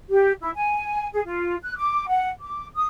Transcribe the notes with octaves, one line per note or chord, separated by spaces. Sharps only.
G4
E4
G#5
G#4
F4
F#6
D6
F#5
D6
D#6